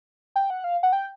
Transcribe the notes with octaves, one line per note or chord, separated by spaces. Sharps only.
G5
F#5
F5
F#5
G5